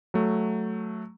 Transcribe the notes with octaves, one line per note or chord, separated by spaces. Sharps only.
F#3 A3